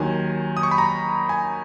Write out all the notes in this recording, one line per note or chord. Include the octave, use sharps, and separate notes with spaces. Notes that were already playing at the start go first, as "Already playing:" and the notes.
Already playing: D#2 D#3 F#3 G#5
D#6
C#6
B5
A#5
G#5